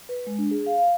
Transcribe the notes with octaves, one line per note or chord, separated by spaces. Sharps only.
B4
G#3
D4
G#4
F5
F5